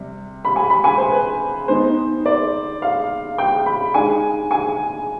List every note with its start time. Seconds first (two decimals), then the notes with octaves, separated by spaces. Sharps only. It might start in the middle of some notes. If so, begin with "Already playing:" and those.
Already playing: C3 G3
0.45 B5
0.56 G#5
0.70 B5
0.84 G#5
0.98 C5
1.12 B4
1.68 D#3 B3 D#4 C5
2.26 D5
2.82 F5
3.38 G5
3.66 B5
3.94 D#3 G#3 D4 G#5
4.51 G#5